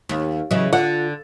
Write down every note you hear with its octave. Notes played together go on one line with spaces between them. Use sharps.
D#2
C#3 E3 F#3 D#5
D3 F4 F#5